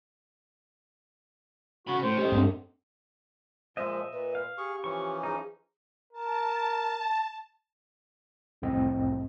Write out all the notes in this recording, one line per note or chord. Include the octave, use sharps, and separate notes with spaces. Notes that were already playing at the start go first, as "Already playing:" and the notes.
C#3 F#4 B5
A2 C5
C#4 G4 A4 D#5
G2 A3 A#3 C4 D4
A#2 F3 G#3 C5 D#5 E5
A#2 B4
F5
G4 G#4 C#6
E3 F3 C#4 C#6
D#4 G#4
A#4 A5
C2 F2 A2 C4 D#5